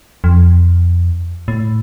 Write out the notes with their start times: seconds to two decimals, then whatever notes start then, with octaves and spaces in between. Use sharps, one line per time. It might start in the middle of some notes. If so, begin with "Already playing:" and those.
0.24 F2
1.48 A2